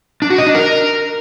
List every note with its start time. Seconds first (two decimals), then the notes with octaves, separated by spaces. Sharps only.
0.22 D4
0.30 F#4
0.38 D#5
0.46 D4
0.55 A#4